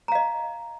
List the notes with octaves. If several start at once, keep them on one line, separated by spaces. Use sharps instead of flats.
D#5 F5 A#5